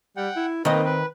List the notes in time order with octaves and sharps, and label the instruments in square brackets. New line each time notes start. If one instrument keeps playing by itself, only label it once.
[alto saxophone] G3 [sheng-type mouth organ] F#5 G5
[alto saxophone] E4
[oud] D#3 D#5 [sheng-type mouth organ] A#3 D#4 B4 [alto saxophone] C4
[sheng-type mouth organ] B4